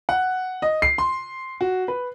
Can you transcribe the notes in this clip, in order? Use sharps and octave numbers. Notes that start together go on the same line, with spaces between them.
F#5
D#5
C7
C6
F#4
B4